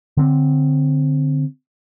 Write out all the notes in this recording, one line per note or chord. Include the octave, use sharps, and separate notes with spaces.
D3 C4